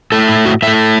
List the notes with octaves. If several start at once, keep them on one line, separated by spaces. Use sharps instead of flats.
A2 A3 A4
E4
F#4
A2 A3 E5